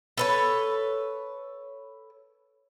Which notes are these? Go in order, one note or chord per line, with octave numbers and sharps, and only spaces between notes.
A4 B4 C#5